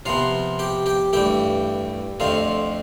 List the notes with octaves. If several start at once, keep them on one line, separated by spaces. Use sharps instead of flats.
C3 F3 B3 F4 F5
G4 G5
G4 G5
G2 E3 A3 G4 G5
F2 D3 A3 C4 F4 F5